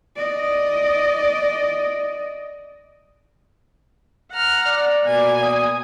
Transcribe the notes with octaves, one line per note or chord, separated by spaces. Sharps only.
D5 D#5
F#5 A#5 F6
D5
B2 A#3 G#5
D#6